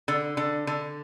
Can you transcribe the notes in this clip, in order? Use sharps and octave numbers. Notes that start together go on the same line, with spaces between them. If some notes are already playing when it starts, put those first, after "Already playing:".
D3
D3
D3